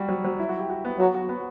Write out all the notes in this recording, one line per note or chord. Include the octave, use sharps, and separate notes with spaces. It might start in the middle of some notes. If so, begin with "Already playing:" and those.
Already playing: G3 F#4
F#3
F#3
E4
F#4
G4
F#4
B3
F#3 F#4
F#4
B3